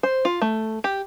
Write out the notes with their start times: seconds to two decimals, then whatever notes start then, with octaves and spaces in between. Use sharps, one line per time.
0.03 C5
0.25 F4
0.42 A3
0.84 G4